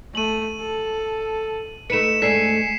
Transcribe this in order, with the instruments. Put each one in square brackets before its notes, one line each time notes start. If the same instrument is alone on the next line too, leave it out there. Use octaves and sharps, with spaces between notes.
[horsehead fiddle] A3 [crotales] D#7 F#7
[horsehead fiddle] A4
[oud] A3 B4 [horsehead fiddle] D#4 [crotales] C#7 E7
[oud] G#2 A3 D4 [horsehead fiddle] G#5 [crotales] B6 C7